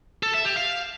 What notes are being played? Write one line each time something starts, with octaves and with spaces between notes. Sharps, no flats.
A4
E5
G4
F5